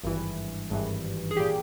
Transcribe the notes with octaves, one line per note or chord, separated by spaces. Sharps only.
G#1 G2 E3
G#1 G2 E3
G#4
A#2 G4